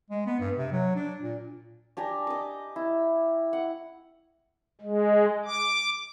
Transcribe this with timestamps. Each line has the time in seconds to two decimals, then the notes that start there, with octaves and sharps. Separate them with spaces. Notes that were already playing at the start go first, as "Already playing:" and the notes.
0.10 G#3
0.26 B3
0.40 G2
0.57 C3
0.72 F#3
0.96 D4
1.22 A#2
1.97 D4 G4 G#5 A#5
2.27 D#5 D6
2.76 E4
3.53 F#5
4.81 G#3
5.45 D6